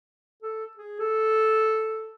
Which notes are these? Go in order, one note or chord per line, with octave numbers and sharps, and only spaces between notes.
A4
G#4
A4